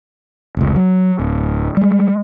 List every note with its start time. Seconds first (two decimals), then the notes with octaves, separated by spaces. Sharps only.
0.57 F1 C#2
0.76 F#3
1.19 D1
1.77 G3 G#3